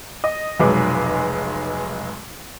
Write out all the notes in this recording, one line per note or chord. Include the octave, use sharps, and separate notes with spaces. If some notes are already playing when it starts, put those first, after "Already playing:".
D#5
F1 B1 F#3 G#3 B4 D6